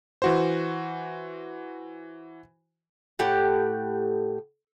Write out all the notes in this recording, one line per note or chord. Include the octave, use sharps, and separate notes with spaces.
E3 F#4 C5
A2 G4 F#5